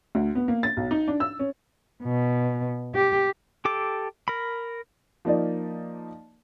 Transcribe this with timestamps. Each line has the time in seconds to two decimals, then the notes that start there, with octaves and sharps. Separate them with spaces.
0.15 D2
0.35 B3
0.48 A#3
0.63 A6
0.77 B1
0.91 D#4
1.08 D4
1.20 E6
1.39 C#4
2.03 B2
2.95 G4
3.65 G4 A4 D6
4.28 A#4 B5
5.25 F3 A#3 D#4 D5